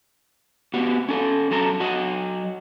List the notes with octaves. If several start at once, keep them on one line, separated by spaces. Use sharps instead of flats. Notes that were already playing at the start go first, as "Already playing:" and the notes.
B3 F#4 G4
C#4 A4
F#3 A4 A#5
F#3 F#4 D#5